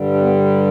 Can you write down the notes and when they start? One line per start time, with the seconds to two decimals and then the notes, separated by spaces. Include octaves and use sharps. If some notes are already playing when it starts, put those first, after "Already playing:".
Already playing: G2 D3 G3
0.14 D4
0.21 B3